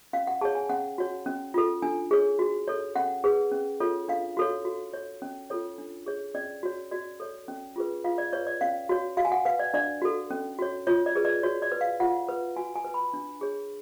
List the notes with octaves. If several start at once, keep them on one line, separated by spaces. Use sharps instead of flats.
C#4 F5
F#5
G#4 C#5 A5
G#5
C#4 F#5
F#4 C#5
C#4
F4 A4
D4 G#5
G#4 C#5
F#4
A4 C#5
C#4 F#5
G#4 B4
C#4
F4 A4 C#5
D4 F5
F#4 A4 C#5
F#4
C#5
C#4
F4 A4 C#5
D4
G#4 C#5
C#4 D5
F#4 C#5
F#4 D5
A4 C#5
C#4
F4 G#4 B4
F4 F5
D5
B4 C#5
D5
C#4 F5
F#4 C#5
F#4 F5
G#5
F#5
B4 F5
D5
D4 D5
F#4 A4
C#4
F#4 C#5
F4 C#5
D5
G#4 B4
D5
F#4 C#5
D5
B4
F5
F4 F#5
B4
F#4 G#5
G#5
B4
B5
D4
G#4 C#5